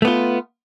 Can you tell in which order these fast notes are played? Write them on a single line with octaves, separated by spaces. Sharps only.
A3 B3 F4